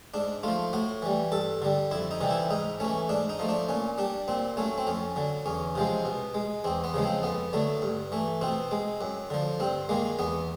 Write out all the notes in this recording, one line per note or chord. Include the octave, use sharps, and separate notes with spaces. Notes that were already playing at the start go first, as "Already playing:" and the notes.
G#2 D4
F3 A3 F4
A2 F#4
E3 G3
G2 A4
D3 G3
F2 E4
D#4
C3 E3 G3
E4
G#2 D#4
E3 A3 C#4
G#2 D4
D#4
F3 A3
D4
A#2 C#4
G3 D4
A#2 C4
F#3 A3 C#4
C4
F2 C#4
D3 F#3
E2 C#4
C3 F3 G#3
B2
G#3
E2 C4
B3
C#3 F3 G#3
C4
F2 B3
D3 F#3 A3
G2
E3 A3
B2 C4
G#3
F#2
D3 F3
G2 C4
D#3 G#3 A#3
E2 B3